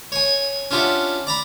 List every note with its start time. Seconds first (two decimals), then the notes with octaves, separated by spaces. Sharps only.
0.12 C#5 G#5
0.71 C#4 D4 F4 G4 E5 F#5
1.27 D5 A#5 B5